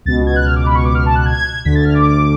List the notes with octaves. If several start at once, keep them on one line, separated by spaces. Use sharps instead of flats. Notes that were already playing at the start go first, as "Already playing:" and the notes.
C#2 B2 A6
G#6
F#6
F6
D6
B5
C#6
D6
F6
A5
F#6
G#6
D2 D3 B6
A6
F6
D6